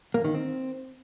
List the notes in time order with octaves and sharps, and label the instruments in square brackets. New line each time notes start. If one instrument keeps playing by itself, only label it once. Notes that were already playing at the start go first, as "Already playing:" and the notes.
[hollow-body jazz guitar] A#3
D#3
C4